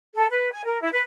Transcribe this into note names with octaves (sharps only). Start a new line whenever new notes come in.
A4
B4
G#5
A#4
E4
B4